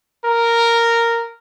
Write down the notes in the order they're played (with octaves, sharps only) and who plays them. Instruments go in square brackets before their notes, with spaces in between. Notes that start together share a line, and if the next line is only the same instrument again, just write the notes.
[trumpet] A#4